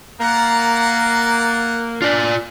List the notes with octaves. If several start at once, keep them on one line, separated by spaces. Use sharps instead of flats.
A#3 D5 F#5 A#5
D4 F4 D5